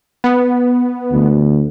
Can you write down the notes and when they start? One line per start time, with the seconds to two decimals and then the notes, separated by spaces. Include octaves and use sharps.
0.24 B3
1.12 D2